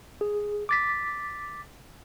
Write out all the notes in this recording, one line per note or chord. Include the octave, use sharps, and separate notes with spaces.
G#4
D6 A6 B6